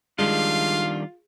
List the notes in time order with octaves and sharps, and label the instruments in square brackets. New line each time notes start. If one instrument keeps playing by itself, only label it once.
[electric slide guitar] D#3 G3 D4 [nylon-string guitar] G#3 [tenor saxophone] F4 [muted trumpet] F5